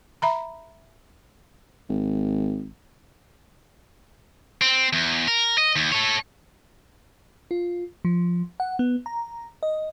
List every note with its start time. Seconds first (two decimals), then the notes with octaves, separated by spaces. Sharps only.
0.22 E5 A#5 B5
1.90 G#1
4.61 C4
4.93 E2
5.28 A#4
5.58 D#5
5.76 D#2
5.92 A4 C#5
7.51 F4
8.05 F3
8.60 F#5
8.79 B3
9.06 A#5
9.63 D#5